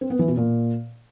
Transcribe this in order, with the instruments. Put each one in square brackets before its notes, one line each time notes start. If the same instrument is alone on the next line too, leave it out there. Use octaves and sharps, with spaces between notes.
[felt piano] C4
B3
E3
B2
A#2